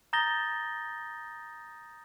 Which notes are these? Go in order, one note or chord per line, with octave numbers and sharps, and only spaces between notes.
A#5 D#6 G6 A6 A#6 G7